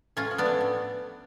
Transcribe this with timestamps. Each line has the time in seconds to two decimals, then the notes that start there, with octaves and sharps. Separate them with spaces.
0.17 A2 C#4 F4
0.31 F3
0.38 B3 D4
0.46 A3
0.61 A2